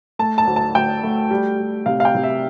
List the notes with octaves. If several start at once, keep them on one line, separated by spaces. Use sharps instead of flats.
A3 A5
A5
D2
A5
D2 G5
A3
G3
G3
C3 F5
F5
G5
C3
E5